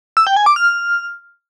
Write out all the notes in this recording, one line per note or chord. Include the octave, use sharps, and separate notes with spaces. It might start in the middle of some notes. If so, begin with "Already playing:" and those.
E6
G5
G#5
D6
F6